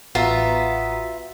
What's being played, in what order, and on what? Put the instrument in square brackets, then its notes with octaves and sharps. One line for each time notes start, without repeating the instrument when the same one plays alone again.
[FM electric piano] A1 F#4 A#5 [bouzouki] B3 [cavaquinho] F4 [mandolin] E5